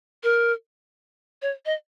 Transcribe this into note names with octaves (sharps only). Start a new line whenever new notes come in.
A#4
C#5
D#5